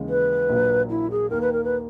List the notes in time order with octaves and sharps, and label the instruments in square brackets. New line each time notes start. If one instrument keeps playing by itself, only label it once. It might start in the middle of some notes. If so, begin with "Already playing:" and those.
Already playing: [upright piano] D#2 C#3 E3 G#3
[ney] B4
[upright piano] A#1 A#2 F#3 A#3
[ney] E4
G#4
[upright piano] D#2 D#3 A#3 [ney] A#4
[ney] B4
A#4
B4